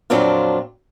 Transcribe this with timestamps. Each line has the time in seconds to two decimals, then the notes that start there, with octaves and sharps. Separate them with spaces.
0.10 F2 A#2 F#3 C4 D4 F4